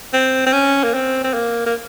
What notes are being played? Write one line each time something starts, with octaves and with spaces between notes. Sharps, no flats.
C4
C4
C#4
A#3
C4
C4
A#3
A#3